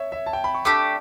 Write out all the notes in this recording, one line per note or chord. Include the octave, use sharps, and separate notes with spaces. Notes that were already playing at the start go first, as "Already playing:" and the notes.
Already playing: C#5 E5
E5
A5
G5
B5
C#6
A3 D4 G4 D6